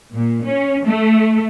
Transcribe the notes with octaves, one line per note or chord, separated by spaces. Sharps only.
A#2
C#4
A3